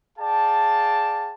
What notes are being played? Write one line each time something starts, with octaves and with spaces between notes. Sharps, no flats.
G#4 D5 F5 G5 A5